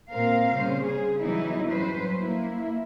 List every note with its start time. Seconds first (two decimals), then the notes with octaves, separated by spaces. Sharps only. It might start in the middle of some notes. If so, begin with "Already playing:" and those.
0.11 A#2 A#3 C4 A#4 F5
0.56 C#3 G3 C5
0.85 G#4
1.19 E3 F#3 G3 B3 D#4 E4
1.71 F#3 C#4 B4 C5
2.19 A#3 E4